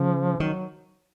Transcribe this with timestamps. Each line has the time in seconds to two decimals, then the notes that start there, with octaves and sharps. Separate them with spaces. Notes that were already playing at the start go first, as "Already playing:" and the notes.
Already playing: C#3 F3
0.40 D#3 F#3